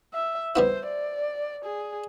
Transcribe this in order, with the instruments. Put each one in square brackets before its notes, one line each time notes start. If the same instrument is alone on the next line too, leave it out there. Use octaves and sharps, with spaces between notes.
[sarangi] E5
[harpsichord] G3 B3 E4 [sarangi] C5
[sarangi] D5
G#4